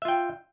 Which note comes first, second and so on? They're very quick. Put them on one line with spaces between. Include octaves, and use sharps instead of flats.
E5 F4 G5